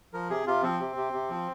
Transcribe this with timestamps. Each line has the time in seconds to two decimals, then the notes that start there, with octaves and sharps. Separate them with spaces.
0.13 F3 A#4
0.30 C3 G#4
0.47 C3 F4
0.63 F3 C4
0.80 C3
0.96 C3
1.13 C3
1.30 F3